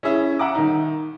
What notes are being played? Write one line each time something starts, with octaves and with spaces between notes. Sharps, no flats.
C#4 E4 G#4 E5
E5 F#5 A#5 D6
D#3 D#4